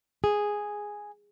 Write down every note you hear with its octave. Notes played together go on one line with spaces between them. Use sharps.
G#4